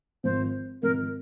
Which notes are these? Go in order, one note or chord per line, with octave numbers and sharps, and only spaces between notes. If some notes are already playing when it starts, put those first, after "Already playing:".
G#1 G#2 F3 C5
G#1 G#2 F3 A#4